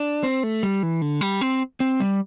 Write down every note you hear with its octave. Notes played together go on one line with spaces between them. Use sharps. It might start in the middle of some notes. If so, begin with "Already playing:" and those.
Already playing: D4
C4
A3
G3
E3
D3
G3
C4
C4
G3